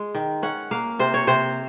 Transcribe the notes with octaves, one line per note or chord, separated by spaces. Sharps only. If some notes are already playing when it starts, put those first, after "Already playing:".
Already playing: G#3
D#3
C#4 F#5
A#3 F5
C3 C5
C#5
C3 C5